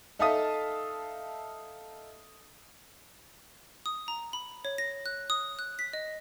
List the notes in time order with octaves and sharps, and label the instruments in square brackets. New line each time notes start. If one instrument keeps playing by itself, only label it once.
[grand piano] D#4 A4 E5 F5 A5 D#6
[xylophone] D#6
A#5
B5
C#5
A#6
F#6
D#6
F#6
B6
D#5